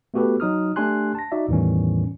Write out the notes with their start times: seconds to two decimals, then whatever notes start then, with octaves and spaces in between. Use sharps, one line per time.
0.14 A3 B3 F#4 G4 A4 B4
0.40 F#3 D#4 D#6 F6
0.76 A3 D4 G4 G#5 C6 F#6
1.15 A5 A#6
1.32 D#4 F#4 D5 E5
1.49 E2 A2 D#3 E3 G3 C#4